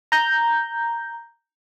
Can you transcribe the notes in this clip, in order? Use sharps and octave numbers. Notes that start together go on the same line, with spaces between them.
A#5 G6